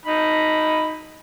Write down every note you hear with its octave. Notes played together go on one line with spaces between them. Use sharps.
D#4 B5